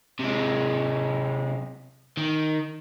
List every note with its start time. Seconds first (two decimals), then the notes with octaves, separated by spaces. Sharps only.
0.19 C3 G#3
2.18 D#3